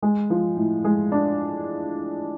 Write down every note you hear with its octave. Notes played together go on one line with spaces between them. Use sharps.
G#3
F3
A2
G#3
D4